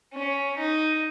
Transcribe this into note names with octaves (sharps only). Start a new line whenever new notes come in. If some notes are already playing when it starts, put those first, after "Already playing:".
C#4
D#4